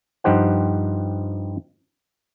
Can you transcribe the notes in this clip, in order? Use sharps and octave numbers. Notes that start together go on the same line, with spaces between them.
G2 F3 D#4 G4 C5 F#5